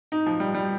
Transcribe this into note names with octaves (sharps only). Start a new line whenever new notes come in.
D#4
F3
G3
G3